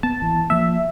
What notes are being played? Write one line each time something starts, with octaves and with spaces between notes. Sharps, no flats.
B3 A5
G#1 E3
F3 A#3 E5